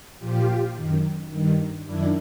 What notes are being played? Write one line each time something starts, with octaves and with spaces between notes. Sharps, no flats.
A#2 F3 F4 G4
F#2 D#3
G2 D#3
F#2 D#3 D4 E4